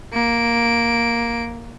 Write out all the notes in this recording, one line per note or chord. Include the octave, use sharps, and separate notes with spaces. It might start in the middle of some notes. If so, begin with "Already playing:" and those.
A#3 D7